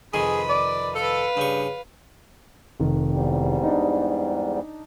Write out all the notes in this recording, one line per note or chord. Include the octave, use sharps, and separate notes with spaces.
F2 C3 D#3 G#4 B4 B5
D5
A4 B4 F5
G2 C#3 C#6
F1 D#3
E2 G#2 G3
D4 D#4